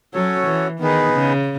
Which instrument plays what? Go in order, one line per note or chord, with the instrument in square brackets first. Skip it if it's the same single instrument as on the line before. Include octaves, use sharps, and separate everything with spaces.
[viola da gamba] F#3 [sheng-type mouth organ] C#4 F#4 A4 C#5
[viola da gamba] E3
[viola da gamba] D#3 [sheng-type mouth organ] B3 D#4 G#4 B4
[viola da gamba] C#3